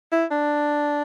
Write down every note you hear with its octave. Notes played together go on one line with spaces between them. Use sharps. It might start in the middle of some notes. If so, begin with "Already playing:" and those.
E4
D4